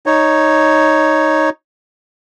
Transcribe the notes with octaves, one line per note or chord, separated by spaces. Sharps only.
D#4 C#5